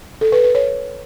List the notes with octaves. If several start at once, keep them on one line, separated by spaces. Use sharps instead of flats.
A4
B4
B4
C#5